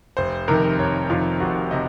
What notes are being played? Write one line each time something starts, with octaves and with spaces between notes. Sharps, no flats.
F1 C5
F2 C3 D#3 A#4
F1 C#5
F2 C3 D#3 F4
F1 F#4
C3 D#5